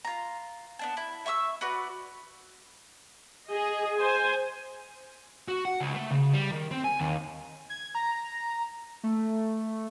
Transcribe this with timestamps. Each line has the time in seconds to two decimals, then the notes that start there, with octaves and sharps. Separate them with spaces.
0.05 F4 A#5
0.79 B3 D4 A5
0.97 E4
1.26 E5 C#6 D#6 E6
1.61 F#4 B4 D5
3.46 G#4 D#5
3.96 C5 G#5
5.48 F#4
5.65 F#5
5.80 C#2
5.94 A3
6.11 C#3
6.33 G3
6.51 D#3
6.71 C4
6.84 G#5
7.00 D#2
7.70 G#6
7.95 A#5
9.03 A3